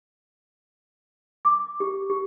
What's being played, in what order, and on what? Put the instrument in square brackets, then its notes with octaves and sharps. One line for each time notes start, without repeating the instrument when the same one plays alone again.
[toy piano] D6
G4
G4